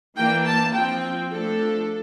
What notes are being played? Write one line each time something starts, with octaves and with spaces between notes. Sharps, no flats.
E3 A#3 D4 G5
A5
F3 C4 G5
F3 A3 D4 A4